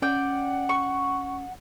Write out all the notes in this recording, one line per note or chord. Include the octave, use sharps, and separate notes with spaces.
C#4 D5 F#5 G5
C#6